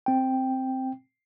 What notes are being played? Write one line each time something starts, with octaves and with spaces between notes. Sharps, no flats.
C4 G5